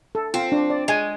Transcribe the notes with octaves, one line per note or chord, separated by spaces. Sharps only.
A4
C4 F4
D4
D5
G#3 G#5